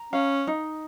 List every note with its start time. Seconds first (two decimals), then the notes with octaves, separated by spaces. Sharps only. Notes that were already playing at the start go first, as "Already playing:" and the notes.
Already playing: A#5
0.13 C#4 F5
0.47 D#4